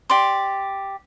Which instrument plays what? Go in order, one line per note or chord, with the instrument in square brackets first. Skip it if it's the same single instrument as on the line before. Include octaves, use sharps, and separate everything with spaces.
[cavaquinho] G4 D5 C6